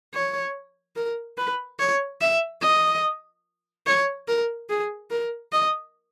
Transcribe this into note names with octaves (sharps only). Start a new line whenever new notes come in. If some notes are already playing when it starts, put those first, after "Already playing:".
C#5
A#4
B4
C#5
E5
D#5
C#5
A#4
G#4
A#4
D#5